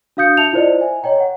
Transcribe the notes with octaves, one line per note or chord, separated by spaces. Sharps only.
D4 F#4 F5 D#6 G6 C#7
E5 A5 C#7 F7
E4 F4 A#4 C5 D5 D#5
E5 G#5
C#5 D#5 G5 A#5
F#5